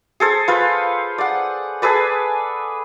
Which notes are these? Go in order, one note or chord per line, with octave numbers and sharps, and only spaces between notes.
G#4 A4 C5
F4 B4 C5
D5 F#5
G#4 A4 B4 D5